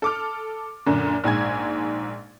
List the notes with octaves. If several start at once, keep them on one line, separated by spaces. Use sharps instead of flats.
A4 D6 F6
F#2 A#2 D3
A#1 G#2 G#5 G#6